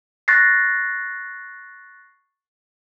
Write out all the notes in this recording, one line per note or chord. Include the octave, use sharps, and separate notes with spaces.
C#6 F#6 A6 A#6 C7